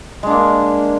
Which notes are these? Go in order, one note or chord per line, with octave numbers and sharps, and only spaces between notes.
G#3 A#3 D4